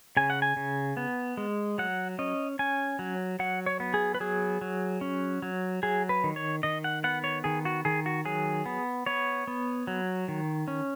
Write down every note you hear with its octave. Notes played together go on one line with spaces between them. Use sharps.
C#3 G#5
F#5
G#5
C#3
B3
G#3
F#3 F#5
C#4 D#5
C#4 G#5
F#3
F#3 F#5
C#5
B3
G#4
B4
F#3 G#4
F#3
C#4
F#3
F#3 G#4
B4
D#3
C#5
D#3 D#5
F#5
B3 F#5
C#5
D#3 G#4
F#4
D#3 G#4
F#4
F#3 G#4
B3
B3 C#5
B3
F#3
D#3
C#4